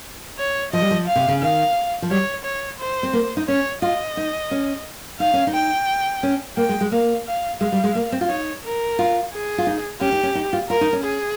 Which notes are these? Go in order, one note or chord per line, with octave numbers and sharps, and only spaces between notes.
C#5
F3 D#5
G3
F3
F5
C3
C#3
D#3 F5
F3
G3 C#5
C#5
C5
C4
A#3
D#4
C#4 C#5
F4 D#5
D#4
C#4
D#4 F5
C#4
D#4
G5
C#4
A#3 G5
G#3
G#3
A#3 F5
F5
G#3 F5
G3
G#3
A#3
C4
F4
D#4 C#5
A#4
F4
G#4
F4
D#4
C#4 G4
D#4
C#4
D#4
F4
F4 A#4
D#4
C#4
G#4